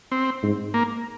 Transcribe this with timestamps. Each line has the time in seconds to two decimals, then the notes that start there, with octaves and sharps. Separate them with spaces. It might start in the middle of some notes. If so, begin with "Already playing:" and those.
0.12 C4
0.43 G#2
0.74 A#3